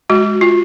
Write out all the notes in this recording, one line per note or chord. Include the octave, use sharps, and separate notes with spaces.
G#3 F#4
F4